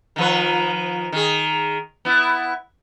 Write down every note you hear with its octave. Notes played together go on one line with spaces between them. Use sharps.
D#3 F3 B4
D#3 G#4
B3 E4